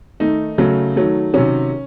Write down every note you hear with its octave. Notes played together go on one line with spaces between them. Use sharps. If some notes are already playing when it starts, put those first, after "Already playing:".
D#3 A3 D#4
C#3 F#3 A3
D#3 F#3 A3
C3 D#3 F#3 C#4